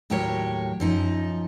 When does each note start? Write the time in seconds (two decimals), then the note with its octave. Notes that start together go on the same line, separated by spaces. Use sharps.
0.10 D#2 A2 F#3 G4 A#4 C#5
0.80 F#2 F3 D#4